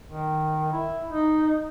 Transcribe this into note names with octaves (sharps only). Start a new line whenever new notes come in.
D#3
E4
D#4